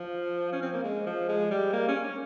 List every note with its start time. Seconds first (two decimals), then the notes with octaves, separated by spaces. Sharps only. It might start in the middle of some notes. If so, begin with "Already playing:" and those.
Already playing: F3
0.53 C#4
0.62 C4
0.73 A#3
0.84 G#3
1.06 F3
1.29 G#3
1.51 G3
1.73 A#3
1.88 C#4
2.03 C#4